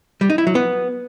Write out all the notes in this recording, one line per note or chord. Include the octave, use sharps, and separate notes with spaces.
G3
D#4
E4
F#3
B3